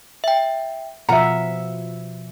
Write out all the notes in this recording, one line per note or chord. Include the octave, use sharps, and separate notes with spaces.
E5 G5
B2 F3 F4 E5 F#5 A#5 C#7